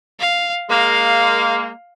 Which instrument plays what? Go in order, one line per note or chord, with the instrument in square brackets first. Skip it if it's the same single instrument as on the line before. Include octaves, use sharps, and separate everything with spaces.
[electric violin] F5
[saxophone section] G#3 A#3 [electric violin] F5